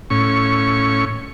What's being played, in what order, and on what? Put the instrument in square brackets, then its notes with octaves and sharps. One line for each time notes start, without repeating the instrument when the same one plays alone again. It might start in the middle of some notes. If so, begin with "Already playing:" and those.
[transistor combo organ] A2 C#4 C#6